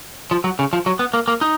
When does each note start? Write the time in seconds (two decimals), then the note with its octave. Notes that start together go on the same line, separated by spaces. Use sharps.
0.31 F3
0.44 F#3
0.59 C#3
0.73 F3
0.86 F#3
0.99 B3
1.14 A#3
1.28 A#3
1.41 D#4